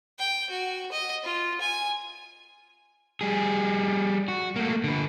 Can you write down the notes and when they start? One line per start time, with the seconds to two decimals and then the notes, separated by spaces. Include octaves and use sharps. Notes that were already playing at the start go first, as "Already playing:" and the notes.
0.19 G5
0.50 F#4
0.92 D#5
1.24 F4
1.61 G#5
3.21 G3 G#4
4.28 F#4
4.56 A3 A#3
4.84 D3 B4